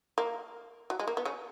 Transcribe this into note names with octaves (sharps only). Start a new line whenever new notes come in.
A#3
F#3
G#3
A#3
B3
C#3 C#4